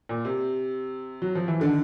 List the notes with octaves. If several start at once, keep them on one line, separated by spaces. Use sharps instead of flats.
A#2
C3
F#3
F3
E3
D3 D#3